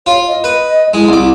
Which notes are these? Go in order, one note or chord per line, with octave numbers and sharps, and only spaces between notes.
F4 C#5
D#5
B4
G#3 E4
C2 D6